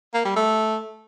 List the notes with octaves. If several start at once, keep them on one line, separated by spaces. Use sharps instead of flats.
A#3
G3
A3